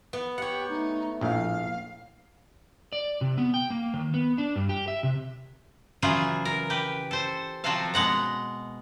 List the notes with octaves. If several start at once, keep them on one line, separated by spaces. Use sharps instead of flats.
B3
G4 C#5 F#5
A3 D#4
A#1 A2 F5
D5
C3
B3
G5
A#3
D#3
B3
D4
G2
G4
E5
C3
C#3 E3 F#3 F4 G#4
A#4
G4 B4
A4 C5
C3 F3 F#3 F#4 A4 F5
B2 G#3 F#5 A#5